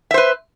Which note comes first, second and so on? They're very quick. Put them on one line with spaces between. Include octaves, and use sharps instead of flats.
E5 C5 B4